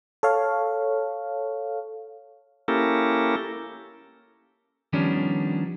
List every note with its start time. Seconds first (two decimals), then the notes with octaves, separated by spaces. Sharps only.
0.23 A4 C#5 F5
2.68 A#3 C#4 E4 G4 A4 A#4
4.93 D#3 F3 G3 B3 C#4 D4